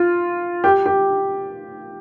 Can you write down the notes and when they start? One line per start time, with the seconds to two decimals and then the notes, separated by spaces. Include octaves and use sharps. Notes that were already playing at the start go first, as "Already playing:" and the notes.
Already playing: F4
0.64 G4
0.86 G4